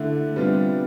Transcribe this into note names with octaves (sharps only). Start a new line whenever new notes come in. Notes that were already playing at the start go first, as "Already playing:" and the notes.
Already playing: D3 A3 E4
C3 G3 B3 D4 F4